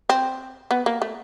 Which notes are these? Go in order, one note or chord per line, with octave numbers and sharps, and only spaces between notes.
C4
B3
A#3
A3